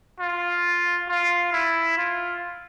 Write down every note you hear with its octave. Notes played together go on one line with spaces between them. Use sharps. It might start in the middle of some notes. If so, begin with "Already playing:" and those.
F4
F4
E4
F4